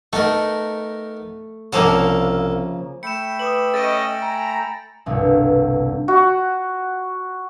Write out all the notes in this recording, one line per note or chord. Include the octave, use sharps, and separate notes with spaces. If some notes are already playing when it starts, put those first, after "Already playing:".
A3 B3 D#4 A#4
C2 C#3 F3 A#3 A4 F#5
A3 G5 B5 C#7 E7
B4 D6 D#6 F#7
C#4 A4 D#5 A6 D7
G#5 A#5
G1 C2 B2
F#4